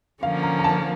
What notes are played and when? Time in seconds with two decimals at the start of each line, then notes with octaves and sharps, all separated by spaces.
0.22 D3 F3 A#3 C#4 F5
0.43 A#5
0.59 A#5
0.64 A5